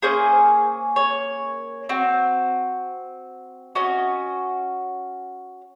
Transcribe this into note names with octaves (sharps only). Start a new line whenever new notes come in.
A#3 C#4 G#4 C5
C#5
C4 F#4
C#4 F#4 D#5